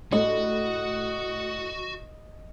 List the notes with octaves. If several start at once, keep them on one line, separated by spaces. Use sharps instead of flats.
A2 F#4 D#5